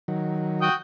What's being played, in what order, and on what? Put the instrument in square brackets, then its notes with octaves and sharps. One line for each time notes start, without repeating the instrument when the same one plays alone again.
[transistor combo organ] D#3 F#3
[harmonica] F#4 G5 D#6